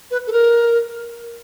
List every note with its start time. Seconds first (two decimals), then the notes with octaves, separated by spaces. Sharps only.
0.11 B4
0.27 A4
0.32 A#4